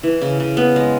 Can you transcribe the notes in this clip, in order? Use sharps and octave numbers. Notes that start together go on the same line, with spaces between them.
E3
C#3
C#3
B3
G#3